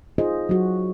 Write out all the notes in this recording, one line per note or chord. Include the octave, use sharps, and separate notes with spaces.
D#4 F4 G#4 C5 D#5
F#3 F#4